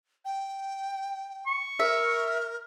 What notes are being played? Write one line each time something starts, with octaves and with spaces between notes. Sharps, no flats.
G5
C#6
A#4 E5